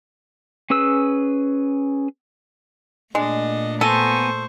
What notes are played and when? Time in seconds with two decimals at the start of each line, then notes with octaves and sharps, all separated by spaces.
0.70 C#4 G#4 B4 E6
3.15 A#2 G#3 A3 D4 D#5
3.81 B3 A4 C5 G#5 A#5 C#6